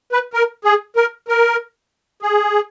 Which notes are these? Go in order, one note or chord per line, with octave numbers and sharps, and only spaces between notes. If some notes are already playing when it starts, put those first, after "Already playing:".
B4
A#4
G#4
A#4
A#4
G#4